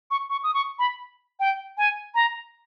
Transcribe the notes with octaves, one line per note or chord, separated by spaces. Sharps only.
C#6
C#6
D#6
C#6
B5
G5
G#5
A#5